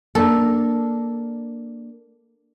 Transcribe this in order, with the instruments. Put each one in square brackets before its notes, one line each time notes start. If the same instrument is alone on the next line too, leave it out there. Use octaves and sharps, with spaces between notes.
[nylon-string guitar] A#3 D4 A#4 [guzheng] A4